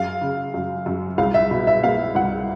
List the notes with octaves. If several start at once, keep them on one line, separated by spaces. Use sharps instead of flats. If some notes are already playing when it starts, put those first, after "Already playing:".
Already playing: F#2 F5
C#3
F#2
F#2
C2 F5
E5
B2
E5
A#3 F5
C2 F#5